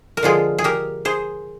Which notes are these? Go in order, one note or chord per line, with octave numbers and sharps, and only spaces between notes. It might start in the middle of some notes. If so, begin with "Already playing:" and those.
A#4
D3 F3 G#3 F4 G#4
G#4
G4 A#4
G#4 C5